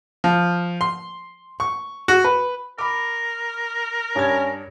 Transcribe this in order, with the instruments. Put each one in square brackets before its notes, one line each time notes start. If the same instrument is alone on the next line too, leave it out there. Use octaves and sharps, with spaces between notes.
[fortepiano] F3
C6
C#6
F#4
B4
[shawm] A#4 [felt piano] B5 D6
[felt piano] G2 G#6 [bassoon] C#4